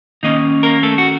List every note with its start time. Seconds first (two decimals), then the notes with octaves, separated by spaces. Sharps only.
0.23 D#3 A#3 C#4 D#4 D#5
0.63 A#3 A#4
0.83 A3 A4
0.98 F#4